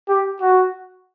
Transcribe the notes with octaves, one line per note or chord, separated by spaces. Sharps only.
G4
F#4